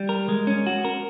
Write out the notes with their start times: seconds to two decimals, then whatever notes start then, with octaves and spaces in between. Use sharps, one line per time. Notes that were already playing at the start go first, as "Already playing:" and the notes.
Already playing: G3
0.09 A#4
0.29 G#3
0.47 C#4
0.67 F#4
0.85 A#4